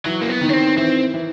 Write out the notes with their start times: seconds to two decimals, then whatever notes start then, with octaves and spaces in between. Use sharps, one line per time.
0.06 E3 F#3
0.22 A#3
0.29 B3
0.41 D#3
0.49 C#4
0.53 C4
0.78 E3 C4
1.14 E3